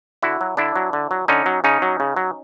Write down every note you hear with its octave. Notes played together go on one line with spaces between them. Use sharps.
D3 E4 F#4
F#3
D3 D4 E4
F#3
D3
F#3
D3 C#4 D#4
F#3
C#3 C#4 D#4
F#3
C#3
F#3